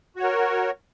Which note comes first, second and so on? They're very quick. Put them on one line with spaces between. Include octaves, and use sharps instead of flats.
F#4 C#5 A#4